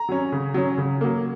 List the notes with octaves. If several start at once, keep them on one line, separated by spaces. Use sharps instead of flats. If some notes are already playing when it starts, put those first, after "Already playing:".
Already playing: A#5
F#3 C#4
C#3
F#3 C#4
C#3
F#3 A#3